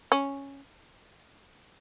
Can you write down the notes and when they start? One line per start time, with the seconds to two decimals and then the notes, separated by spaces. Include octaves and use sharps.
0.12 C#4